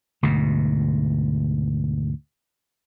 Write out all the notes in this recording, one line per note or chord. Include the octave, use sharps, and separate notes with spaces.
D2 G#2 B2